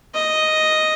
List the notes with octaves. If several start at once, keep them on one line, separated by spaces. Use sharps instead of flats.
D#5